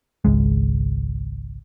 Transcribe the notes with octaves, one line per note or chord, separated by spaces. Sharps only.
G#1 C#2 G#3